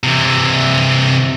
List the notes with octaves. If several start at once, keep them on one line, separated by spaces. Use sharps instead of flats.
C3 E3